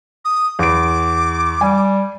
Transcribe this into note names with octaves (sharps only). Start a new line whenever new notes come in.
D#6
E2 D6 D7
G3 G#5